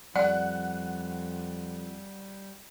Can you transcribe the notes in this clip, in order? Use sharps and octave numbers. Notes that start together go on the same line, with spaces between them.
F2 G3 D5 F#5